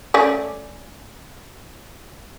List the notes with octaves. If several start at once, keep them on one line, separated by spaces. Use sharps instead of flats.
A3 C#4 D5